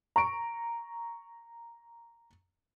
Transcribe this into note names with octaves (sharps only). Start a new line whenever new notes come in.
A#5 C#6 D7